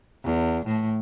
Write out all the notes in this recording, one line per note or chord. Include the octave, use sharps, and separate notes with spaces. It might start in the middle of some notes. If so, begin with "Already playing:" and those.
E2
A2